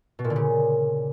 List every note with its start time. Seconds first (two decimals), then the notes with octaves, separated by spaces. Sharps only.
0.19 B2
0.24 A#2
0.30 D3
0.36 C#3